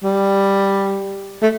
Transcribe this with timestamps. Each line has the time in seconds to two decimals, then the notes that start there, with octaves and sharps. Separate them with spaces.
0.03 G3
1.42 A3